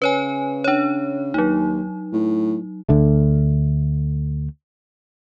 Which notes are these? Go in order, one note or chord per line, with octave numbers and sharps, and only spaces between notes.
C#3 B4 C#5 G#5
D4 C#5
D#2 F#3 D#4
A2
D2 D3 A3